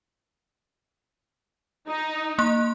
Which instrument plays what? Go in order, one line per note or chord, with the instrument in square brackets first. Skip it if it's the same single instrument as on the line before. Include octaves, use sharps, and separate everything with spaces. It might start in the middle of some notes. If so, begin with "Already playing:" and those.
[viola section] D#4
[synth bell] A#3 C6 F#6